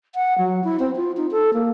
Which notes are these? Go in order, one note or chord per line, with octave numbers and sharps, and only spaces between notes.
F#5
F#3
E4
C4
F4
D#4
A4
A#3